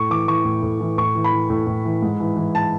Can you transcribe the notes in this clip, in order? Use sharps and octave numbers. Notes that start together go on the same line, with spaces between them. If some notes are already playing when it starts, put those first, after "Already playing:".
Already playing: A2 C#6
E3 D6
E3 C#6
A2
A2
E3
A2 C#6
E3
B5
E3
A2
A2
E3
G#2
E3
E3
A5